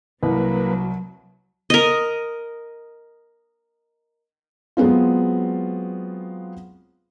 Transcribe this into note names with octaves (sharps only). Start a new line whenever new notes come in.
C2 F#3 A#3 B4
A#4 D#5
F#3 G#3 B3 C4 F4